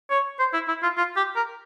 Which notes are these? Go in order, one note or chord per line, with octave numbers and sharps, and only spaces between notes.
C#5
C5
E4
E4
F4
F4
G4
A#4